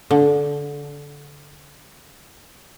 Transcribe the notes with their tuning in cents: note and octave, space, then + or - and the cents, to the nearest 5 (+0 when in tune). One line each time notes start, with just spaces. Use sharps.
D3 -20